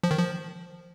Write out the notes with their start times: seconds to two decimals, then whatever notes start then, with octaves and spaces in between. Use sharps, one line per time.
0.04 F3
0.11 D#3
0.18 F3